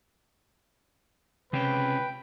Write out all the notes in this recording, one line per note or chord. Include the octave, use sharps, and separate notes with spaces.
C#2 C3 C#4 B4 G5